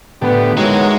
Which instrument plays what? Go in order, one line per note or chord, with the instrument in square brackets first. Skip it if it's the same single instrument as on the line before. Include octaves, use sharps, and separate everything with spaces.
[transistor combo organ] A2 D3 G4 [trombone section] B3
[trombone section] E3 F#3 [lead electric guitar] G#3 [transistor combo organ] D#4 F#4 A#4